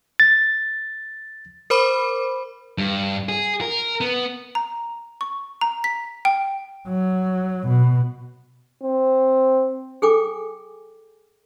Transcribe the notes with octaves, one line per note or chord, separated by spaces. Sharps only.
A6
A#4 C5 B5 D6
G2
G#4
A#4
B3
A#5
C#6
A#5
B6
G5
F#3
B2
C4
G#4 A4 G5 G#5 D6